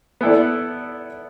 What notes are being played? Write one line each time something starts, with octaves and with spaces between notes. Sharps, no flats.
B3 E4 A4 D5